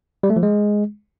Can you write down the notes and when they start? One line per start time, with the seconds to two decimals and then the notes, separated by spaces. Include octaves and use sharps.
0.23 G3
0.30 A3
0.36 F3
0.43 G#3